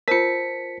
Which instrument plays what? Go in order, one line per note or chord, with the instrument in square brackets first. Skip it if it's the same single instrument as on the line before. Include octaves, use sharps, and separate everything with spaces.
[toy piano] F4 A#4 [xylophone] C5 A5 [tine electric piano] B6 C#7